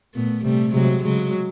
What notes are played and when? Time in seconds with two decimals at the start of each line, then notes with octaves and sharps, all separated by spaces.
0.15 A#2 A3 B3
0.44 C3 G3 A3
0.74 C3 F#3 G#3
1.03 C#3 F#3 G#3